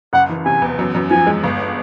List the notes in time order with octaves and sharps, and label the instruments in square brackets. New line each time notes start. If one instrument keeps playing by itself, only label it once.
[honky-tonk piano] F#1 [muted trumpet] F#5
[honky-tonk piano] E3
[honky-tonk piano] C3 [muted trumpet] G#5
[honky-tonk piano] E2
F#2
F#2
[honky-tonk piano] F3 [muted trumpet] G#5
[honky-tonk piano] G#3
G1